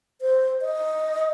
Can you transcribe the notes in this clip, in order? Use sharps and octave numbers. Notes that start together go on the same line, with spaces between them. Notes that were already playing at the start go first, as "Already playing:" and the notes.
C5
D#5